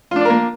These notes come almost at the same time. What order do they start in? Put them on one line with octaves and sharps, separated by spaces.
F4 D4 D5 A#4 A#3